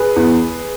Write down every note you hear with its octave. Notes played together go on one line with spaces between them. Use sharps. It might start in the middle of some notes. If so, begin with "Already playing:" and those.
Already playing: G#4 B4
E2